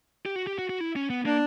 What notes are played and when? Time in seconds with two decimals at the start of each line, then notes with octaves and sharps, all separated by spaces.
0.26 G4
0.36 F#4
0.47 G4
0.59 F#4
0.69 F#4
0.80 E4
0.96 C#4
1.10 B3
1.25 A#3 D4